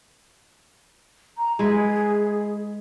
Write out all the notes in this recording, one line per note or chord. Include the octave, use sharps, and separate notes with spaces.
A#5
G#3 E4 G#4 B4